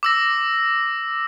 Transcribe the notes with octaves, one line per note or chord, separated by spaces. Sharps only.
D6 E6 A#6